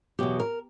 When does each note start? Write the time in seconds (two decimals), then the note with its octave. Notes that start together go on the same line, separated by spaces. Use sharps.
0.19 E2 B2 F#3 G4
0.40 A#4